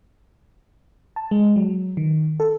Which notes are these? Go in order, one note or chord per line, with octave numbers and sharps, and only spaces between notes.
A5
G#3
F#3
D#3
A4